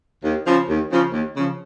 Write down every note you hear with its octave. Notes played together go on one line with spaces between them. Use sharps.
D#2
C#3 F3
D#2
C#3 F3
D#2
C#3 F3